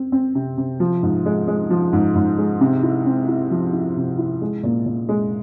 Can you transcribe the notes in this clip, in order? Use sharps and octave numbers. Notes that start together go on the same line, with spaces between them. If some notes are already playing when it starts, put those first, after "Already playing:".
Already playing: C4
C4
C3
C3
F3
G#2
G#3
G#3
F3
G#2
G#2
G#3
C3
E4
C4
E4
F3
E4
C3
E4
G#3
A#2
A#2
G#3